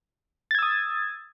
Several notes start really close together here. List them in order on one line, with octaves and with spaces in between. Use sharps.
A6 G#6 E6 D#6